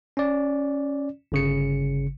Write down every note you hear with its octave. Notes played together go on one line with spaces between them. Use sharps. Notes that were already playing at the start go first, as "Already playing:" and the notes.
C#4 D5
G1 C#3 C#7